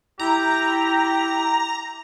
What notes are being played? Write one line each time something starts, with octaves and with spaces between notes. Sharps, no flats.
E4 G4 A#5